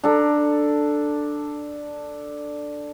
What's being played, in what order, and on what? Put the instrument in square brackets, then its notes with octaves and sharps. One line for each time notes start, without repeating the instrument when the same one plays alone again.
[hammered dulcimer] D4 A4 A#5